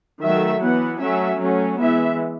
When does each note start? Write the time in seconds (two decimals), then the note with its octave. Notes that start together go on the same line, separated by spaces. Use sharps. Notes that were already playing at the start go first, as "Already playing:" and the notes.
0.22 D#3 F#3 A3 E5
0.61 E3 B3 F#5
1.00 F#3 A3 C#4 E5
1.39 F#3 A3 C#4
1.79 E3 G#3 B3 E5